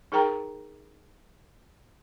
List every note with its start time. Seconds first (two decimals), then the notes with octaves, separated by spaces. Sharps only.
0.12 D#4 G#4 A#4 G5 A#5